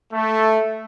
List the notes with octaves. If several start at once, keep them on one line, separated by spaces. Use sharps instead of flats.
A3